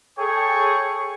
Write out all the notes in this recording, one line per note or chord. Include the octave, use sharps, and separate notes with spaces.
G#4 A4 C#5 G5 C#6